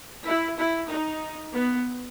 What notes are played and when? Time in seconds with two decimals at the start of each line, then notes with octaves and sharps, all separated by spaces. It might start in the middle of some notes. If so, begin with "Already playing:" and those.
0.25 E4
0.58 E4
0.90 D#4
1.54 B3